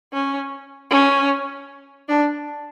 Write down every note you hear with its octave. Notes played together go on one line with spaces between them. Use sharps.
C#4
C#4
D4